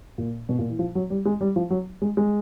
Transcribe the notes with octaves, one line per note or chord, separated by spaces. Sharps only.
A#2
B2
A#2
E3
F3
F#3
G3
G#3
G3
F3
F#3
G#3
G#3